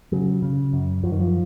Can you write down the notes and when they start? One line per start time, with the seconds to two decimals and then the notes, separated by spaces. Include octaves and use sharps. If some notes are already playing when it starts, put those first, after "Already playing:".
0.12 C#3 F#3
0.42 C#3
0.73 F#2
1.03 F#2 F3
1.12 D#3
1.20 F3